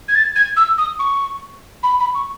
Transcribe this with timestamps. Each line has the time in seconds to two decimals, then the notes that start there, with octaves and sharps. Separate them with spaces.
0.08 G#6
0.15 A6
0.36 G#6
0.57 E6
0.78 D#6
0.99 C#6
1.83 B5
2.00 B5
2.15 C#6